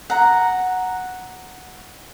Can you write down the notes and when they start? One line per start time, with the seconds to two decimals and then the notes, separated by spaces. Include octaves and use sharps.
0.10 F#5 A#5